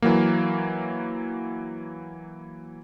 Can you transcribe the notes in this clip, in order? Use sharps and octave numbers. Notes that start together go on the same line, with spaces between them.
E3 F#3 A#3